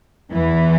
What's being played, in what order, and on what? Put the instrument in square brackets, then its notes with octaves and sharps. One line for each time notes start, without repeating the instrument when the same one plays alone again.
[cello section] E2 E3